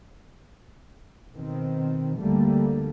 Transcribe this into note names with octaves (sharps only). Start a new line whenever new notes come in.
B2 D#3 C4
D2 D3 G3 A3 A#3